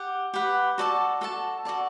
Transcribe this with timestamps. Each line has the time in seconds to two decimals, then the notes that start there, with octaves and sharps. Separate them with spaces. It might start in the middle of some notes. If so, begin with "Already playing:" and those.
Already playing: G4 F#5
0.34 G4 B4 F#5
0.78 F#4 A4 D5 A5
1.21 F#4 A4 D5 A5
1.65 F#4 A4 D5 A5